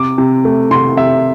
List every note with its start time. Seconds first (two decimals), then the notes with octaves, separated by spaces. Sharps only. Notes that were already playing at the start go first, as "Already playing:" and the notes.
Already playing: C3 D6
0.18 C3
0.45 A3
0.71 C3 C6
0.97 C3 E5